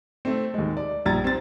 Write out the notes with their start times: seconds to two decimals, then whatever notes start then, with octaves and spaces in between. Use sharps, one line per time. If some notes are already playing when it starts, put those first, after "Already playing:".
0.25 A3 C4
0.54 D#2 G#3
0.77 D5
1.05 A#1 G3 A#5 G#6 A6
1.24 C4 A6